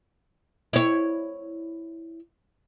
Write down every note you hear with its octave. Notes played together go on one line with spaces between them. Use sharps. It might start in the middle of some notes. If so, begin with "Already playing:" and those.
E4 C#5